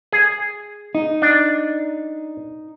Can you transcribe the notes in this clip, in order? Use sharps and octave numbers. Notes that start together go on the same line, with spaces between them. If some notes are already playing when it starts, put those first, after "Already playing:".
G#4
D#4
D4